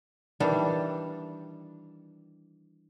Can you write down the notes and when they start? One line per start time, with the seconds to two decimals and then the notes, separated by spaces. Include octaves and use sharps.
0.40 D#3 E3 G3 D4